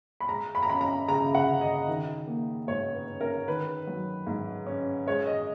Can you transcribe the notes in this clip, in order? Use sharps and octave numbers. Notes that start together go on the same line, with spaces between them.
B5
G#3 A#5
B5
A#5
C#4 B5
A#5
C#3 A#5
F#5
C#3
D#5
D#3
A#3
G#2 C#5
B4
C#4
A#4
D#3 B4
F#3
G#2
C#4
G#3 C#5
D#5